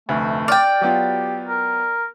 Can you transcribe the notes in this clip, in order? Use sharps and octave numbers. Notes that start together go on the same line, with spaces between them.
F1 D2 A3
D5 G5 F6 A6
F#3 B3 F4 G4
A#4